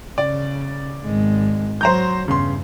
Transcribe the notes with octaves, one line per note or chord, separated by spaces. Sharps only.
C#3 D5
G#1 G#3
F#3 C5 A#5 G6
E2 G2 C#3 C6